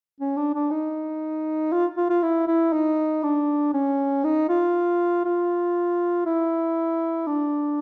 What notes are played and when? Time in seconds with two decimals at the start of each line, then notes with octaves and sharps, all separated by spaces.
0.21 C#4
0.37 D4
0.55 D4
0.71 D#4
1.72 F4
1.97 F4
2.10 F4
2.23 E4
2.48 E4
2.73 D#4
3.23 D4
3.74 C#4
4.24 D#4
4.49 F4
5.25 F4
6.26 E4
7.27 D4